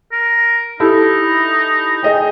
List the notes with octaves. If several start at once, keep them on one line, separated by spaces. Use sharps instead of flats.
A#4
D#4 E4 G4 A4
G#4 D#5 G5